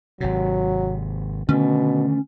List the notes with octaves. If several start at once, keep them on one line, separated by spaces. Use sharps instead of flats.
G#1 C3 F#3
B2 D3 D#3 A3 C#4